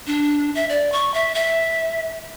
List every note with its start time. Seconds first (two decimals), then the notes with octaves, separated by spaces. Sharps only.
0.07 D4
0.55 E5
0.69 D5
0.92 C#6
1.14 E5
1.35 E5